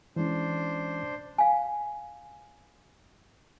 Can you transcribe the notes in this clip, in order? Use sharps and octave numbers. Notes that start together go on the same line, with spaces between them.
E3 G#3 C#4 D4 C5
F5 G#5